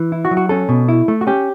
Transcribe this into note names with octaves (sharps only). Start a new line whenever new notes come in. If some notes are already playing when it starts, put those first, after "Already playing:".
Already playing: E3
E4
F#4
F#3
F#4
C#4 A4
B2
E4
A3
F#4
C#4 G4